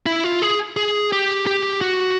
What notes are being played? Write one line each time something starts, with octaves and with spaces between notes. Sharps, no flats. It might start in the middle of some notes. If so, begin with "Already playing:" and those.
E4
F4
G#4
G#4
G4
G4
F#4